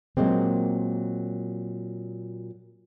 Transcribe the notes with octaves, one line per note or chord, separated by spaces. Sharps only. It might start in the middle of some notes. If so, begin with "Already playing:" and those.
A#2 F#3 G#3 A#3 C4